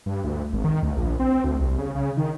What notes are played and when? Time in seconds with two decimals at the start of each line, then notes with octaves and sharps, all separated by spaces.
0.06 G2
0.24 D2
0.53 G#1
0.65 D#3
0.83 D2
0.97 A#1
1.20 C4
1.44 D2
1.59 C2
1.78 C#3
1.95 C#3
2.17 D#3